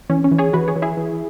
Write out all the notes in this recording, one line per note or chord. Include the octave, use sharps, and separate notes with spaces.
E3 C#4
C#4
E3
G#4 C#5
E3 F#4 B4
G#4 C#5
E3
E4 G#4
E3